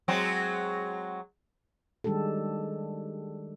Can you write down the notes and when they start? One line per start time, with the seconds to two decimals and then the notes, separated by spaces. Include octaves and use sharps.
0.08 F#3 G#3 C4
2.04 D#3 G3 G#3 D4 G4 A4